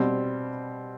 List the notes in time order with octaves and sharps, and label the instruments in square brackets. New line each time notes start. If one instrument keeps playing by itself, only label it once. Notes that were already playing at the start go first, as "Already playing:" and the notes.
Already playing: [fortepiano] B2 G3 C4